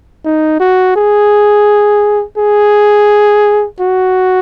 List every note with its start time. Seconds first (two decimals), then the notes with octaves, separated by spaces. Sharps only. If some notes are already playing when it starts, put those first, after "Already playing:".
0.24 D#4
0.60 F#4
0.96 G#4
2.38 G#4
3.80 F#4